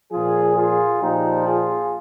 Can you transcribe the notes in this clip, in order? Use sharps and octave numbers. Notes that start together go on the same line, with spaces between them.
A#2 F3 F4 G#4
F4 G#4
A#2 F3 D#4 G4
F4 G#4